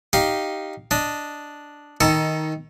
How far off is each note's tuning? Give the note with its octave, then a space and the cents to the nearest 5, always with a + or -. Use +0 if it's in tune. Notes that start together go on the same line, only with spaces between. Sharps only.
D#4 +0 G4 -10 F5 +0
D4 +0 D#5 +0
D#3 +10 D#4 +20 A4 +10